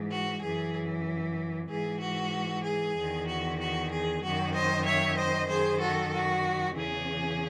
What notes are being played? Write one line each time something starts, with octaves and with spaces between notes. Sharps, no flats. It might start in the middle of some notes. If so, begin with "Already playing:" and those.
Already playing: G#2 E3
F#4
F#2 E3 G#4
G#2 E3 G#4
F#4
G#4
E2 D#3
F#4
F#4
G#4
F#2 D#3 F#4
C5 D#5
C#5 E5
C5 D#5
F#2 D#3 G#4 C5
F#4 A4
F#4
E2 C#3 E3 G#4